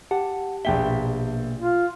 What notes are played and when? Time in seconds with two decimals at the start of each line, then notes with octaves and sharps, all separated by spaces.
0.11 G4 F#5 A5
0.65 A#1 B2 A#3 E5 G5 G7
1.59 F4